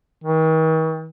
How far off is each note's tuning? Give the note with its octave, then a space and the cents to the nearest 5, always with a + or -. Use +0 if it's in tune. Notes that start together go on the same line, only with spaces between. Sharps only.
D#3 +45